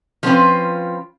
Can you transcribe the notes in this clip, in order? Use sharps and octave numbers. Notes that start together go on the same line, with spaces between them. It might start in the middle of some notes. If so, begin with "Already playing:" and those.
F3 G3 C4 C#4 F4 B4